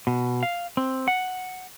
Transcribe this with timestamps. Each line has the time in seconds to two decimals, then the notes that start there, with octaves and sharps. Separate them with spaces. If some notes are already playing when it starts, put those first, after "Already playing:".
0.07 B2
0.43 F5
0.77 C4
1.08 F#5